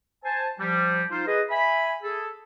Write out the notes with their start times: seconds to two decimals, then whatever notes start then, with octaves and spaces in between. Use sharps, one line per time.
0.25 C5 G#5 A5
0.59 F3 G3
1.11 D#4 F4 C5 F5
1.27 G#4 B4 D#5
1.50 E5 G#5 B5
2.03 G#4 A4